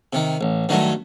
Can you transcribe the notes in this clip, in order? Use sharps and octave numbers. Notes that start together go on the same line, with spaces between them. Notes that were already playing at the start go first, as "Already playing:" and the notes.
C3 D#3
A1
G2 D#3 F#3 A3